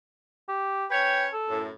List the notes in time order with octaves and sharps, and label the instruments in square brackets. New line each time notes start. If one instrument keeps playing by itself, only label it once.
[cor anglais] G4
[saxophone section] C#4 B4 C#5 [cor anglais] G5
[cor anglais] A4
[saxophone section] F#2 A2